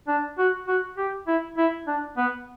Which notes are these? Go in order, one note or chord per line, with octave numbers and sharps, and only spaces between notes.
D4
F#4
F#4
G4
E4
E4
D4
B3